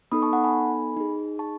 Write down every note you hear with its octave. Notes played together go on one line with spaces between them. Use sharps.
B3 D#4 A4 B5 D#6
A5 C#6
F#5 A5
G#5 B5
D#4 G#4
A5 C#6